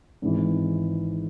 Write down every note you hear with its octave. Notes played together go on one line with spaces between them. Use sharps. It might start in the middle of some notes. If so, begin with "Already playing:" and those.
G#1 G#2 E3